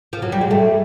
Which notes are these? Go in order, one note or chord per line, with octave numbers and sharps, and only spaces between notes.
F3
F#3
G3
G#3
A3